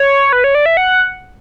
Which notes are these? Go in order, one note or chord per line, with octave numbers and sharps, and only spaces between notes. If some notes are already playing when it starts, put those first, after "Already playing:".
Already playing: C#5
B4
C#5
D5
E5
F#5